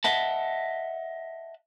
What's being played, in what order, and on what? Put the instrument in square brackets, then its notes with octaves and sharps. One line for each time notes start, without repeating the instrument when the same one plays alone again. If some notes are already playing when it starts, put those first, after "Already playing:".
[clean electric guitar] D#5 E5 F#5 A5